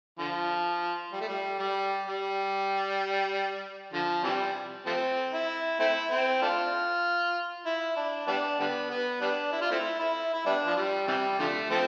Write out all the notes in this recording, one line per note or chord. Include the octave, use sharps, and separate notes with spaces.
D3 F3
G3
A3
G3
G3
G3
D3 F3
C3 E3 G3
F3 A3 C4
E4
A3 C4 E4
C4
A3 D4 F4
E4
D4
G3 B3 D4
D3 G3 B3
B3
G3 B3 D4
E4
F4
A3 C4 E4
E4
E4
G3 B3 D4
F3
G3
C3 E3 G3
D3 F3 A3
F3 A3 C4